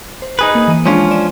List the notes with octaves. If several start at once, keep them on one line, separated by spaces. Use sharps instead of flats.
C5
D#4 G#4 B4
A#3
E3 A#3 D#7
F3 G#3 C#4 D4 F4
D5 E7